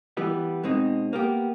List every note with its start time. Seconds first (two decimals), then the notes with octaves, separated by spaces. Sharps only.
0.17 E3 G3 B3
0.64 B2 G#3 C4 D#4
1.13 A#3 B3 G4